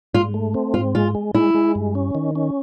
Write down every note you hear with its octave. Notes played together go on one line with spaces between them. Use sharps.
G#2 F4
A3
C4
G#2 F4
G#3 F4
G#3
G#3 E4
G#3
G2
C#4
D#3
C#4